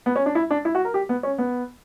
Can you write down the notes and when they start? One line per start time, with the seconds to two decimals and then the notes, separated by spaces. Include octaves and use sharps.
0.06 B3
0.16 C#4
0.26 D4
0.35 E4
0.51 D4
0.65 E4
0.75 F#4
0.85 A#4
0.94 G4
1.09 B3
1.23 C#4
1.38 B3